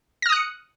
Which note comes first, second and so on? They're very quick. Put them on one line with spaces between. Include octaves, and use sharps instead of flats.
A#6 F6 D#6 F#6 C#7